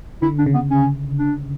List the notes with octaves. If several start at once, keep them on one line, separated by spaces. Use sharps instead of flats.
D3 E4
D4
C#3
B3
C#4
D4